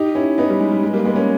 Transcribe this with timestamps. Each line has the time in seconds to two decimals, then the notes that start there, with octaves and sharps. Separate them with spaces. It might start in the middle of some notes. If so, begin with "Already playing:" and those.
Already playing: D#4 G4
0.15 C#4 E4
0.38 B3 D#4
0.50 G3
0.60 G#3
0.72 G3
0.83 G#3
0.93 G3 A#3
1.05 G#3 B3
1.16 A#3 C#4